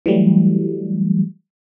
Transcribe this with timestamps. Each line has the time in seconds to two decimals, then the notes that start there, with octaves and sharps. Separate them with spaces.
0.06 E3 F#3 G3 A3